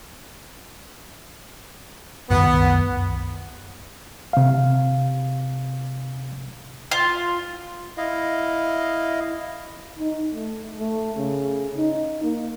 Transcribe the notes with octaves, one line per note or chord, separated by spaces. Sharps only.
C2 F#2 D#3 B3
C3 F5
F4
E4 D#5 F5
D#4
A3
A3
C#3
D#4
A#3